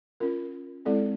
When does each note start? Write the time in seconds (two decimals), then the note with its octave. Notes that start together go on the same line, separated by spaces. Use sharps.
0.20 C#4 F4 A#4
0.85 G#3 C4 E4 A4 D5